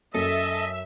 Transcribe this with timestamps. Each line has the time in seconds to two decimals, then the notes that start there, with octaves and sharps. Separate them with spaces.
0.14 F#2 A4 D#5 E5